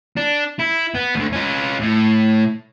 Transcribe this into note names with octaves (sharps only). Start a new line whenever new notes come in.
D4
E4
B3
D2 D3
C#4 F4
A2